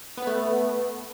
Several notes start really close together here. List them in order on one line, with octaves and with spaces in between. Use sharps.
B3 B4 A3